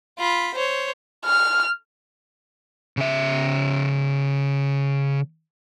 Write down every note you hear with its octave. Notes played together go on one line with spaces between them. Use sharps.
F4 B5
C5 C#5
F6
C#3 E5